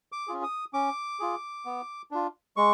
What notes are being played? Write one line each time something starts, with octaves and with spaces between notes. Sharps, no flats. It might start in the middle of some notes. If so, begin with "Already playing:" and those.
D6
C#4 F4 G#4
D#6
C#4 D6
F4 G#4
B3
D4 F4
G#3 C#6